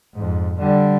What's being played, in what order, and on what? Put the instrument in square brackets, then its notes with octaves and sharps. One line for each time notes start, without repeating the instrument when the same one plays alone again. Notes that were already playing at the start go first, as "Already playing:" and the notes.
[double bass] F2 G#2
D3 G3